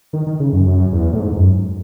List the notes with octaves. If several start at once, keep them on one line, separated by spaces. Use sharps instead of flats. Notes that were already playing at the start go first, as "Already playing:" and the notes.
D#3
D#3
C#3
F#2
F#2
E2
A2
G#2
F#2